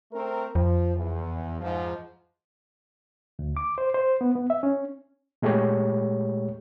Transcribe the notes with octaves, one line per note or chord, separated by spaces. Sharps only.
A3 C4 A#4
F2 F3
E2
G#2 F3
D2
D6
C5
C5
B3
B3
E5
C#4
A#2 G#3 A3 G4 C#5